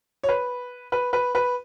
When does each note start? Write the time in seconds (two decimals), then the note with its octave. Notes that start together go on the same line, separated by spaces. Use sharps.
0.23 C#5
0.29 B4
0.92 B4
1.13 B4
1.35 B4